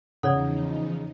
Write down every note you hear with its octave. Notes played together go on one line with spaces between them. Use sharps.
E2 C#3 F3 D#4 A4 C#5 D5 F#5